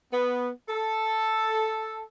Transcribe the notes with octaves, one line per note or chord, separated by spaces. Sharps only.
B3
A4